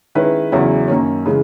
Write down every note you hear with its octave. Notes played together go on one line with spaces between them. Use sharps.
D#3 G#3 C#4 E4 B4
E2 C#3 F#3 C#4 E4
F#2 D#3 A#3 C#4
C#3 E3 G#3